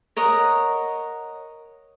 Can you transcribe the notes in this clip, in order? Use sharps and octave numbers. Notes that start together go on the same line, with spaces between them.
A#4 C#5 D#5 F#5